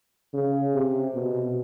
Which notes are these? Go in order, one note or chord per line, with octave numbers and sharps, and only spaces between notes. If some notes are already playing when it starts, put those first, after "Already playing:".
C#3
C3
B2